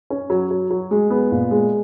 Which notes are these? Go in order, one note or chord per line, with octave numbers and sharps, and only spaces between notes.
C#4
F#3
F#3
F#3
G#3
B3
A#2
G#3